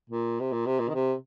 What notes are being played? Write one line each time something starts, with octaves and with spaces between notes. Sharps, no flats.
A#2
C3
A#2
C3
A#2
D#3
C3